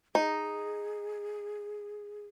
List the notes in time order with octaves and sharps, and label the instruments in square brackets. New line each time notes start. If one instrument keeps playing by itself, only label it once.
[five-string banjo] D#4 [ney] G#4